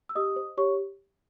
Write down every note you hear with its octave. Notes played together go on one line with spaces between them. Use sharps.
E6
G4 D#5 D#6
C5
G4 C#5 C#6